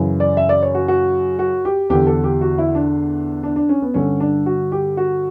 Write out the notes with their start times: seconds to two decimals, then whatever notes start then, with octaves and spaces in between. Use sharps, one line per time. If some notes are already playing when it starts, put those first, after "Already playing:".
Already playing: F#2 C#3 E3
0.20 D5
0.37 E5
0.49 D5
0.63 C#5
0.75 F#4
0.88 F#4
1.39 F#4
1.65 G4
1.90 E2 D3 G4
2.07 A4
2.24 G4
2.41 F#4
2.58 E4
2.75 D4
3.43 D4
3.56 D4
3.69 C#4
3.82 B3
3.94 G2 D3 C#4
4.20 D4
4.46 F#4
4.72 G4
4.97 F#4